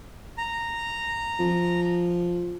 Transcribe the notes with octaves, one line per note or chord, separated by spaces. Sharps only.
A#5
F3